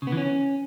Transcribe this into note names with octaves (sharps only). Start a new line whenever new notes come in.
C#3
B3
E3
C#4